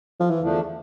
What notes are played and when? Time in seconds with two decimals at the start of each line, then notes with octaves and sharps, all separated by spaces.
0.20 F3
0.30 E3
0.40 E2 D3 F3 A3 D4